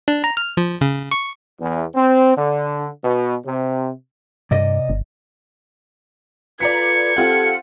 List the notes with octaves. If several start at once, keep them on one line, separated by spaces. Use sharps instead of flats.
D4
A#5
F6
F3
C#3
C#6
E2
C4
D3
B2
C3
G2 C3 D5 D#5
G1
F4 A4 B4 D5 A#5 G#6 B6 C#7
C4 F4 G4 A4 F#5